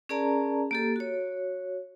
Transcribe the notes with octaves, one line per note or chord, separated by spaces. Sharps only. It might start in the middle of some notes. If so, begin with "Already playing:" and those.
C#4 G#4 A#4 D5 A5 A#5
A#3 G4 A4
F#4 C#5